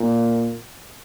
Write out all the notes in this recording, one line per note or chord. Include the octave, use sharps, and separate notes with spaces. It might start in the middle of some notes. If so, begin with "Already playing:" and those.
Already playing: A#2